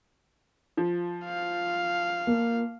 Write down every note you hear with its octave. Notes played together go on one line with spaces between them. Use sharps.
F3
F5
A#3